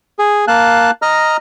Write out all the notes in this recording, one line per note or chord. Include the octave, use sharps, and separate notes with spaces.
G#4
A#3 F5 A5 F#6
D#5 A#5 F6